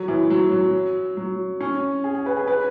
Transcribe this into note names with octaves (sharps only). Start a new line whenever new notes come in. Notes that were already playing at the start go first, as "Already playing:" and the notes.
Already playing: F#3
E3
F#3
F#3
F#3
C#4
G#4
G#4
B4
G#4
B4